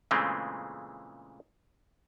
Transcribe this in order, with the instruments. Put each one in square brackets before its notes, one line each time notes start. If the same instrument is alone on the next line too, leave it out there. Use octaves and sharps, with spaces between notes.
[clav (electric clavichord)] A#2 C#3 E3 G#3 A3 C4